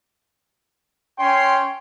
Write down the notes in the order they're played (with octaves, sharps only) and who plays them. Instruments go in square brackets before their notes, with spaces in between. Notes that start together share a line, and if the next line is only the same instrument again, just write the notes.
[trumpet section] C#4 G5 C6